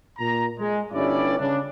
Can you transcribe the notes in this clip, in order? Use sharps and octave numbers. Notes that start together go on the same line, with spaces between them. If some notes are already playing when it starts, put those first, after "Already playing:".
A#2 A#5
G#3
G1 G2 C#4 E4 D5
C#3 D4